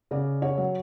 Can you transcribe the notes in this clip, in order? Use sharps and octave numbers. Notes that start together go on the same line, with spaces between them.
C#3 D5
C#5
F#3